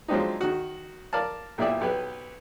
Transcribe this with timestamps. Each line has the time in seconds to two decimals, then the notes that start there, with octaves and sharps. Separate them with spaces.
0.08 F3 F#3 G#3 C4 D4 D#4
0.41 D#3 F#4
1.13 A#4 D5 F5 A5
1.58 B1 A#2 E4 G4 D5 E5
1.81 B1 G4 B4